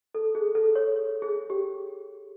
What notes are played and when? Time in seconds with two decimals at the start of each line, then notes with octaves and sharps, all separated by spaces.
0.15 A4
0.35 G#4
0.55 A4
0.76 C#5
1.22 G#4
1.50 G4